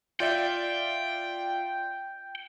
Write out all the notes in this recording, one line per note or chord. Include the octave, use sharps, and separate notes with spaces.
F4 D5 E5 G5